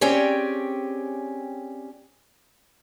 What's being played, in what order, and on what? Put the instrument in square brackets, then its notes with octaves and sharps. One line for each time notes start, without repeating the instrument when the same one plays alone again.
[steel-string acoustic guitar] C4 C#4 G4 G#4 C#5 D5